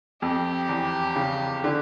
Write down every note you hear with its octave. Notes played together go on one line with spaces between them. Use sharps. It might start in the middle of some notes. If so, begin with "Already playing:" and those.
F2 G4
E2
C#3
D3